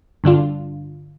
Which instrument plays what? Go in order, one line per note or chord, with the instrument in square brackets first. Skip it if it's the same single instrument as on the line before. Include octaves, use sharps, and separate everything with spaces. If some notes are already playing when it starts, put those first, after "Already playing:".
[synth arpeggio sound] G2 D3 D4 F4